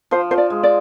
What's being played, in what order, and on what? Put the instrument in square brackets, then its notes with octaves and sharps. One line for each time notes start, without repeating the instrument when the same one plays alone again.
[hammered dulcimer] F3 [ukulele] C5
[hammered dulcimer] F3 [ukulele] C5
[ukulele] D5
[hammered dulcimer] G#3
[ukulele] D5